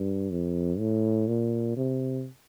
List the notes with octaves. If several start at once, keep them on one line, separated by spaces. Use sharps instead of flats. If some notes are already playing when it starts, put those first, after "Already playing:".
Already playing: G2
F2
A2
A#2
C3